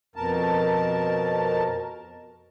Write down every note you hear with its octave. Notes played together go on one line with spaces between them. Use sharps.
F2 B2 A#4 A5